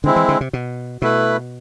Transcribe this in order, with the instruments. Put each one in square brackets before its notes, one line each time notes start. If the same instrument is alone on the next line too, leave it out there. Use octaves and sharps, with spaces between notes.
[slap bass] D3 [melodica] G#3 C4 E4
[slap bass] E3
D3
C3
B2
[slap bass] B2 [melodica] A3 E4 B4